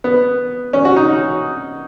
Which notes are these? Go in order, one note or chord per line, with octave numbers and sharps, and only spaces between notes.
B3
C#4
F#4
D#4